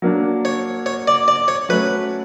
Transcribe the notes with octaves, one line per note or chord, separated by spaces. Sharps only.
F#3 A#3 D4
C#5
C#5
D5
D5
C#5
F#3 A3 C#4 B4